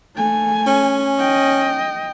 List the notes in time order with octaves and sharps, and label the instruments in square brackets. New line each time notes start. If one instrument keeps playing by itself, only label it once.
[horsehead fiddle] A3 G#5
[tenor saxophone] C#4
[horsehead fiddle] D#5 G5